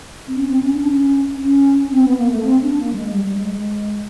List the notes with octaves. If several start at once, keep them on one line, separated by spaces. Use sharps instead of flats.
C4
C#4
C4
C#4
D4
C#4
C#4
C4
B3
A#3
A3
C4
D4
A#3
G3
G#3
G3
G3
G#3
G#3